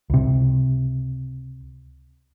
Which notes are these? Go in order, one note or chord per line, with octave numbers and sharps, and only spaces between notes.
C#2 C3